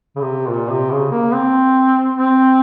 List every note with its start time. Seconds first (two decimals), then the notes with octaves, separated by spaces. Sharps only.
0.16 C#3
0.21 C3
0.49 A#2
0.71 C3
0.91 C#3
1.11 A#3
1.33 C4
2.17 C4